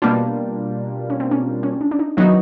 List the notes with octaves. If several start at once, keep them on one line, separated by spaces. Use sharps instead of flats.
B2 G3 A#3 B3 D4 F4
C#4
C4
C#4
C#4
D4
D4
D#4
D#3 F#3 B3 D#4 E4 F#4